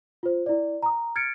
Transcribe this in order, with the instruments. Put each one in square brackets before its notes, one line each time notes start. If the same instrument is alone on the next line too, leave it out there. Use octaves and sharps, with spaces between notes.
[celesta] F4 C5
E4 D5
A#5 D#6
F6 G#6 A6 C#7 D7